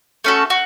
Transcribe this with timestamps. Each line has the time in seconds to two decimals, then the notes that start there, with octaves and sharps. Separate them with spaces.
0.24 A3 C#4 F#4 A4
0.50 F#4